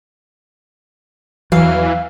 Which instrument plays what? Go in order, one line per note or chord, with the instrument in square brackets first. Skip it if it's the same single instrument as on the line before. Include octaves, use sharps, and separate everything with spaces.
[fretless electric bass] E2 F#3 [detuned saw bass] E3 [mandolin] F5